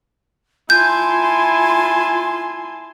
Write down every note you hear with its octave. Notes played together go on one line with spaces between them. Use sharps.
E4 F4 G#5 A5 C6 G6